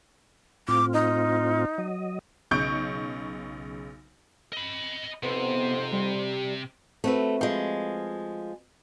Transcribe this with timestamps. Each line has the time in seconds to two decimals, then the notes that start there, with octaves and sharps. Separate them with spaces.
0.68 A2 C4 F4 D6
0.93 D#4
1.78 F#3 D#5
2.51 B1 C#3 C#6 G6 D7
4.53 D#5 B5
5.23 F2 G#2 C3 B3 C5
5.93 G3
7.04 A3 C4 F#4 B4
7.41 F3 G#3